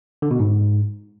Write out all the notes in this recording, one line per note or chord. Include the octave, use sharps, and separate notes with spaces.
D3
B2
G#2